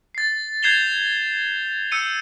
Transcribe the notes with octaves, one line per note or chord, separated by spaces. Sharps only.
A6 C7
G6 G#6 C7 E7 F7 G7
E6 G6 C#7 D#7